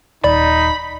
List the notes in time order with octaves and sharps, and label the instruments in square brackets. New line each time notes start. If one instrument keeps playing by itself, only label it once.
[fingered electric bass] D#1 [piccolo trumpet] D#4 [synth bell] D5 [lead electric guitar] B5